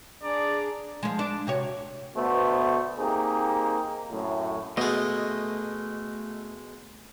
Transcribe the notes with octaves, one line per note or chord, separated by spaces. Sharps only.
D4 G#4 D5 A#5
F3 G#3
D4
C3 F#4 C#5
D2 B2 A3 B3 C5
A#3 C4 D#4 G4 G#4
F#2 A2
B2 G#3 A3 D#5